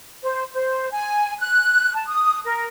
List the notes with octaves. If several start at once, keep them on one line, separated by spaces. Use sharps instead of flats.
C5
C5
G#5
F#6
A5
D#6
A#4